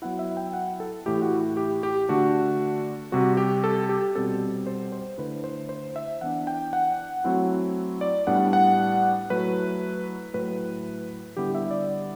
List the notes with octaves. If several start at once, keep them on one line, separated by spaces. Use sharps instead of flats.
F#3 B3 E4 F#5
E5
G5
F#5
A4
A2 E3 A3 E4 G4
F#4
G4
G4
D3 A3 D4 F#4
C3 G3 C4 F#4
G4
A4
G4
B2 G3 C4 A4
C5
C5
D3 A3 E4 B4
C5
C5
E5
E3 B3 D4 F#5
G5
F#5
F#3 A3 C4 E4
D5
A2 G3 B3 D4 F#5
F#5
F#3 A3 E4 B4
A2 F#3 A3 B4
D3 G3 B3 E4 G4
E5
D5